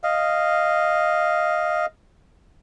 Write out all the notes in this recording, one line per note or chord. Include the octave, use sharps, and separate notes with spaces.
D#5 F5